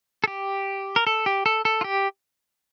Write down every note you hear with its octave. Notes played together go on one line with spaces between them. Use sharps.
A4
G4
A#4
A4
G4
A4
A4
F4
G4